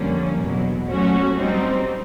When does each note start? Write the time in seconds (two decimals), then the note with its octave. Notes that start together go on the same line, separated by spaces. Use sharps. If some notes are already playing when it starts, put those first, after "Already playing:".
Already playing: F2 D3 G3 A#3 C#4
0.37 E2 B2 F#3
0.86 A#2 F#3 A3 C#4 F#4
1.35 G3 C4 D#4